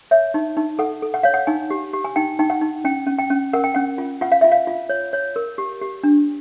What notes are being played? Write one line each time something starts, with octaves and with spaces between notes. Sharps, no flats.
C#5 E5
D#4
D#4
A4 F#5
A4
F#5
C#5 F5
F#5
D#4 G#5
G4
G4
G#5
D#4 G5
D#4 G5
F#5
D#4
C#4 G5
C#4
G5
C#4
A#4 F#5
G5
C#4 F#5
F4
F4 F#5
F5
F4 E5
F5
F4
C#5
C#5
A#4
G4
G4
D4